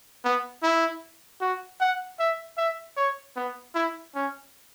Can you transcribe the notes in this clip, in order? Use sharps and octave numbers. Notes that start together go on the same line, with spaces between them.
B3
E4
F#4
F#5
E5
E5
C#5
B3
E4
C#4